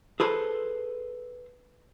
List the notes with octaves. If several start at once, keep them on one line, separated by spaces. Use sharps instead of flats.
G#4 A4 B4 C5